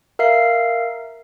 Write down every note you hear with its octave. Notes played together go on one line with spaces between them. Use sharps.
A#4 E5 F5 C7